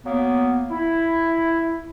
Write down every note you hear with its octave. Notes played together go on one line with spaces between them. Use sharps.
F#3 A#3 B3
E4